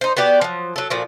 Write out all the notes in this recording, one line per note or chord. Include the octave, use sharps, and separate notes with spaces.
D#4 C5
B3 F#4 G4 D5
F3 F#3
F#3 A4
A#2 F3 F#4